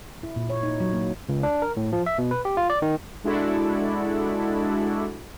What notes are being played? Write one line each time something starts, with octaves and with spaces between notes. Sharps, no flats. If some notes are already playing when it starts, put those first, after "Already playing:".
E4
A#2
C#5
D#4
F#3
A#3
C#2
D4
A#4
A2
F3
E5
B2
B4
G4
F4
D5
D#3
G#3 D4 E4 F#4 A4 D5